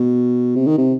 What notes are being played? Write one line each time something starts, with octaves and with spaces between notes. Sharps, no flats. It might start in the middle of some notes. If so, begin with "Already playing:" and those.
Already playing: B2
C3
D#3
C3